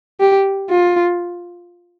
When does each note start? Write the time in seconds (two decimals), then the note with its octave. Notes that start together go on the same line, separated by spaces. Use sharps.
0.21 G4
0.70 F4